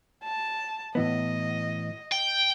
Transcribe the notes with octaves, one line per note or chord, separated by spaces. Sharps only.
A5
A2 E3 B3 D#5
G5